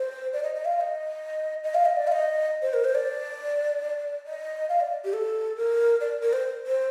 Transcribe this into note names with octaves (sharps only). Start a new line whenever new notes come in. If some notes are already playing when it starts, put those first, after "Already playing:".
Already playing: C5
D5
D#5
D#5
F5
F5
D#5
D#5
F5
D#5
D5
F5
D#5
C5
A#4
C5
D5
D#5
F5
D5
G4
A4
A#4
D5
A#4
C5
C5